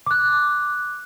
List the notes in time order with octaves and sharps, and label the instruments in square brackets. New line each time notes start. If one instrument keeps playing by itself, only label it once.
[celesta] D6 F#6